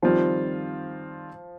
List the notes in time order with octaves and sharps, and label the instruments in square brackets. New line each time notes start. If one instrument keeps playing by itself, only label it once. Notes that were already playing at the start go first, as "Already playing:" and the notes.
[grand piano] D#3 G3 C4 F4 [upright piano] F3